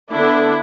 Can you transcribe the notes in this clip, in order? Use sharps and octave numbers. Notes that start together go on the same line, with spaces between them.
D3 B3 D4 E4